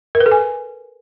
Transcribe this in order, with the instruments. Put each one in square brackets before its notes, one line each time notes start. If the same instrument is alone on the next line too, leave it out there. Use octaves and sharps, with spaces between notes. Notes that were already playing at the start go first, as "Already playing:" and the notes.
[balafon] A#4
B4
A4
G#5